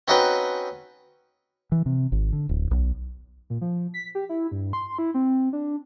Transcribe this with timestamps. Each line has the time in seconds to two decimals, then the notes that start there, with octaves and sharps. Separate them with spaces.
0.08 C4 C#4 D#4 F#4 B4 G5
1.72 E3
1.86 C3
2.12 G#1
2.33 D3
2.49 D1
2.71 B1
3.50 A#2
3.61 F3
3.94 B6
4.15 G4
4.29 E4
4.52 G2
4.73 C6
4.99 E4
5.14 C4
5.53 D4